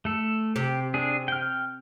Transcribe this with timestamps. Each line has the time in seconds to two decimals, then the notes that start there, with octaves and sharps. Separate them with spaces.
0.05 A3 A4
0.56 C3 G4
0.94 D4 G#4
1.28 G5 F6